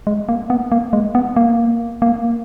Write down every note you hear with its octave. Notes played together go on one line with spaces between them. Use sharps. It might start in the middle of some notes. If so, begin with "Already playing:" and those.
G#3
A#3
B3
A#3
G#3
B3
A#3
A#3